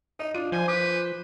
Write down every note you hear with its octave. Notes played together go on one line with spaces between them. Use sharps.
D#4 D#5
D4 F4 D#7
F3 C5 G#5
B4 D6